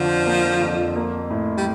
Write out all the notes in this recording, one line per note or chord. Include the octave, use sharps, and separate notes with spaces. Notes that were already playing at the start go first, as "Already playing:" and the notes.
Already playing: F2 D3 F3
A#3
F2
A#3
A2
G3